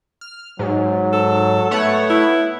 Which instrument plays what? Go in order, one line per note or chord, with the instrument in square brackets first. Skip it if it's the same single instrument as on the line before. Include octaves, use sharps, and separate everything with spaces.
[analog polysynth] F6
[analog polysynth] G#2 [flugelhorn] F#3
[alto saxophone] A4
[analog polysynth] A3 C#5 F#5 [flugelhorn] B3
[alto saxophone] E4